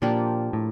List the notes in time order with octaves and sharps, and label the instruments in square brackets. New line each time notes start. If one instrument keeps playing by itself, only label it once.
[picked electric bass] A#2 [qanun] F3 A#3 D4 G4
[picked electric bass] A2